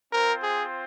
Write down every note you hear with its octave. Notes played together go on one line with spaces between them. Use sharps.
C4 F4 A#4 C5
G#4